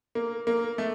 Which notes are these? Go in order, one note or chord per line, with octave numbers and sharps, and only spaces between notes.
A#3
A#3
A3